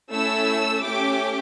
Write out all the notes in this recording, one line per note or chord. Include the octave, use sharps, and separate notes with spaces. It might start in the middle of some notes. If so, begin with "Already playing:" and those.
A3 C#4 E4 A4 E6
A3 C#4 G4 D6